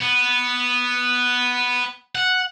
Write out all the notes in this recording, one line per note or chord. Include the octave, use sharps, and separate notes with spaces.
B3
F#5